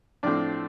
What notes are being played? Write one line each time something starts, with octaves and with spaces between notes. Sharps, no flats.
A2 F3 A3 C4 D4 D5